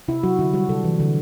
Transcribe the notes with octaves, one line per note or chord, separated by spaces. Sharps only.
C3 E4
F#3 F#4
D3 E4
G3 F#4
C3 A4
E3
D3